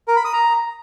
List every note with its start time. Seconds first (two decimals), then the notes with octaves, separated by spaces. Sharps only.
0.08 A#4
0.16 B5
0.25 D#6
0.33 A#5